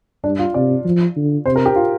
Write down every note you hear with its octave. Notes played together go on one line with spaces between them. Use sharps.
G2 D4
F4
C3 D5
F3
D3
C3 C5
A#4
G4
F4